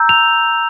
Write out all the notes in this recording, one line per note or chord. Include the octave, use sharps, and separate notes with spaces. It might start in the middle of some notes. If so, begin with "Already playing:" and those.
Already playing: A#5 E6 G6
F7